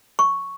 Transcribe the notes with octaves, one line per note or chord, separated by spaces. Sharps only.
C#6